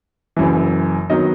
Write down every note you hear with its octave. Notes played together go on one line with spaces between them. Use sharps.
F#1 F#2 E3
D#3 F#3 B3 D#4 D#5